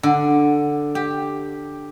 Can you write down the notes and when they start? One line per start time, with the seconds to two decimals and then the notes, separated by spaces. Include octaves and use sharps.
0.03 D3
0.95 G4